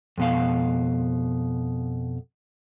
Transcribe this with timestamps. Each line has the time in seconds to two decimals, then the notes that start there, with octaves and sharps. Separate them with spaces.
0.18 F2 B2 F5